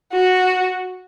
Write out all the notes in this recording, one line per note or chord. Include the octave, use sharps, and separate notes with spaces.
F#4